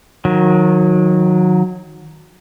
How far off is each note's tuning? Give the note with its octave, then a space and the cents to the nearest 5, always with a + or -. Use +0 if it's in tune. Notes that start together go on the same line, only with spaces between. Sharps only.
D#3 +0 F#3 -25